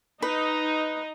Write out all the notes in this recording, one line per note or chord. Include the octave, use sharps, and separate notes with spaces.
D#4 B4